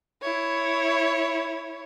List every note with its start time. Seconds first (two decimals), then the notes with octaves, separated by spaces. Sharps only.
0.22 E4 C#5